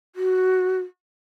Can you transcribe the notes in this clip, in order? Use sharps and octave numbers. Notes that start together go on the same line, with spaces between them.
F#4